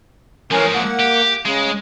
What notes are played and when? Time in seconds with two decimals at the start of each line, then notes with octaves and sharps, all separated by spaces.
0.51 E3 F3 G#3 C#4 A#4
0.75 A#3 F#5
1.00 G4
1.46 C#3 G#3